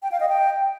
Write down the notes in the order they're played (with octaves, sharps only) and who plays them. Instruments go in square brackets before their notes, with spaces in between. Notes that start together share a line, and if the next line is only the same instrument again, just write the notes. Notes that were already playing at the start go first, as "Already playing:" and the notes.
[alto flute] G5
F5
D#5
G5